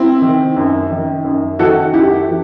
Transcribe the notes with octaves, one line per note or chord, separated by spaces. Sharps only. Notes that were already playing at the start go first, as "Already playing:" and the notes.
Already playing: C4 E4
D#3
F#2
D#3
F#2
D#3 F#4 A4
F#2 E4 G4
E3